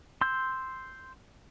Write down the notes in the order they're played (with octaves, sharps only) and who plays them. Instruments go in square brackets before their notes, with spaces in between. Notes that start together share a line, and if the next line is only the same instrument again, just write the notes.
[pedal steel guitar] C6 E6 G6